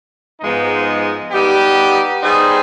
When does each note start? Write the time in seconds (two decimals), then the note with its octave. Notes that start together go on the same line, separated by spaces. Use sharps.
0.41 G#2 F3 G#3 B3 D#4
1.32 G3 B3 D#4 G4
2.22 G3 B3 D#4 G#4 C5